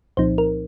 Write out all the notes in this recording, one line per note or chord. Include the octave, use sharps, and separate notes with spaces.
C2 A#2 F3 C4 D#4 C5
A#4